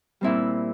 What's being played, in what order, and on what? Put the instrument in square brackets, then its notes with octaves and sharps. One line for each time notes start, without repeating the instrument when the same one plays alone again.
[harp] A#2 G3 C4 E4